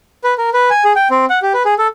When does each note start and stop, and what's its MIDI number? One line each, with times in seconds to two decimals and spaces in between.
0.24 0.34 71
0.38 0.50 70
0.54 0.69 71
0.70 0.84 80
0.85 0.93 68
0.96 1.08 79
1.11 1.25 60
1.30 1.39 78
1.42 1.53 67
1.54 1.63 71
1.65 1.74 68
1.79 1.87 69